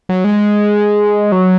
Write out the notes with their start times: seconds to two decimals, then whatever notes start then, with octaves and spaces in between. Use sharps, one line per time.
0.09 F#3
0.24 G#3
1.32 F#3